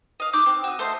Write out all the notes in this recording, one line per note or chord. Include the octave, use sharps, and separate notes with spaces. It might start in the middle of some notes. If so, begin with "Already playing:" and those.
D#5 F5
D#4 D6 F#6 G6
C4
F#4 D#6
A3 C5 D#5 C6